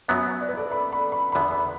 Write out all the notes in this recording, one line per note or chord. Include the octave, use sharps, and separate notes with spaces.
F#2 F#3 B3 B4 E5
D5
B4
A4 D5
B5
B5
B5
E2 D3 B3 B5
B5